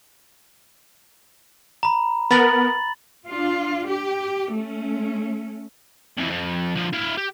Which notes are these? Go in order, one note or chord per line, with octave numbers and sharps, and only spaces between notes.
A#5 B5
B3 A#4 B5 A6 F#7
D4 F4
G4
A3 C#4
F2 E3
F2
D3 F3
E4 F5
G4